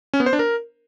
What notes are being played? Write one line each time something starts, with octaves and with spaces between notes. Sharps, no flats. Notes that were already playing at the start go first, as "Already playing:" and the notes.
C#4
B3
C5
D4
A#4